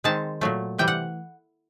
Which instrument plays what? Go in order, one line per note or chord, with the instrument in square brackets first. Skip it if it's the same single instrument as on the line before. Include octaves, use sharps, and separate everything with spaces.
[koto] D#3 G#3 C4 A5
A#2 F#3 A3
C3 E3 G3 G5
F#5